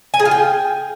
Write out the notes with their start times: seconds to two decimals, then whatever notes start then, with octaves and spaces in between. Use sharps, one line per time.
0.14 G#5
0.20 G#4
0.25 F4
0.31 G5